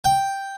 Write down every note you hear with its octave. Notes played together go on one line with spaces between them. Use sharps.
G5